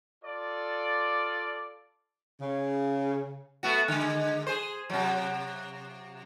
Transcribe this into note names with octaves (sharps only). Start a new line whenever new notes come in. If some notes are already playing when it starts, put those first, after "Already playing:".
F4 A4 D5
C#3
A3 B3 F#4
D3 G#3
G#4 C5
C3 F#3